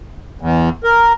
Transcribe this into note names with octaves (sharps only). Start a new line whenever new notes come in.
E2
A#4